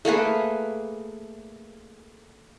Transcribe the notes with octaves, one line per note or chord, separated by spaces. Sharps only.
A3 A#3 G#4 B4